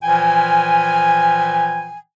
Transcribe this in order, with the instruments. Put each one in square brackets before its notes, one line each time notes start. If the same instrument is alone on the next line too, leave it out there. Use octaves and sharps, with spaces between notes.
[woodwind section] A#2 E3 F3 G5 G#5